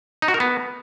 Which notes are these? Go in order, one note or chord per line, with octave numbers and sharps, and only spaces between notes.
D#4
F#4
A#4
B3